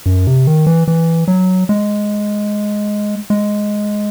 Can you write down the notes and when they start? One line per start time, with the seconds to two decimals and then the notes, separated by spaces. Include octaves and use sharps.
0.06 F#2
0.27 C3
0.47 D#3
0.67 E3
0.88 E3
1.28 F#3
1.69 G#3
3.30 G#3